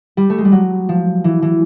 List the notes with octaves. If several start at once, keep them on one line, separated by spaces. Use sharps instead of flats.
G3
A3
G#3
G3
F#3
F3
E3
E3